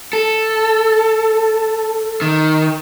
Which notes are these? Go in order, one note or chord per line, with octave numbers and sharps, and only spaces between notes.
A4
D#3